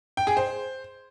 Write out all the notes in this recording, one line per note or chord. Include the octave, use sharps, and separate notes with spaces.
G5
G#4
C5